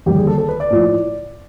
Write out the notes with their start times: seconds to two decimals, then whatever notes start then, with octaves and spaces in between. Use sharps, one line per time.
0.06 D#2 D3 G3 G4
0.17 G#4
0.27 A4
0.38 A4
0.49 B4
0.60 D5
0.70 A2 F3